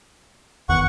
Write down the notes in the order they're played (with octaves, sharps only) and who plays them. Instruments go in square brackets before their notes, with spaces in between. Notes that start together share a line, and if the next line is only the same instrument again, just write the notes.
[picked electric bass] G1 E2 D#3 [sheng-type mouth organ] F#5 C#6